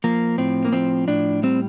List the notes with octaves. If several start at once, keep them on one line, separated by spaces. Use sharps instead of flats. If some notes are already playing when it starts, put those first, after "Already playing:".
F3 A#3
A2 C4
A#3
F3 C4
A2 D4
G3 C4